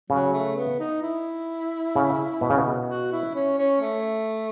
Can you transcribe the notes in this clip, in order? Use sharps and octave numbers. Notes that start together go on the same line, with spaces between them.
C#3 F#3
A3
B3
D#4
E4
C#3
B2
C#3
B2
F#4
E4
C#4
C#4
A3